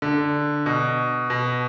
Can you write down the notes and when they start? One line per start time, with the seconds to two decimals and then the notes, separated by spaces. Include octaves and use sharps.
0.02 D3
0.66 B2
1.30 B2